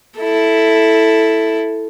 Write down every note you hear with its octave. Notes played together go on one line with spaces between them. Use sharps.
E4 A4